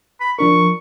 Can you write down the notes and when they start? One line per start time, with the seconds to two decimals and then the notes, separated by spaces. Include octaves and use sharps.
0.20 B5
0.39 F3 D4 A#4 C#6